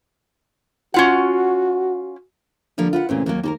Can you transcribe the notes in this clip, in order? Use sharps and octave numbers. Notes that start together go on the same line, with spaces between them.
C#4 F4 F#4 F#5
D3 F3 G3 A#3
F4 B4 F#5
A1 A#2 C#3 C4
D#2 F#3 A#3
D#2 A#3 A4 A#4